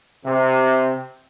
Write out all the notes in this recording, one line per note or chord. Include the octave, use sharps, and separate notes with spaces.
C3